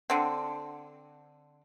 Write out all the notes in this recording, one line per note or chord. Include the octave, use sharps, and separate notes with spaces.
D3 C4